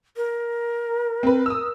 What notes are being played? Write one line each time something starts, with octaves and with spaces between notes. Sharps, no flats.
A#4
C4 B4
D#6 E6